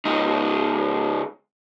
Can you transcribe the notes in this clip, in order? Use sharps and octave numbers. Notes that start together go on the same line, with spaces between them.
C#2 D#4